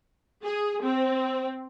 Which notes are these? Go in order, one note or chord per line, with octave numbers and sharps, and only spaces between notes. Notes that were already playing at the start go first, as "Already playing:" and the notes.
G#4
C4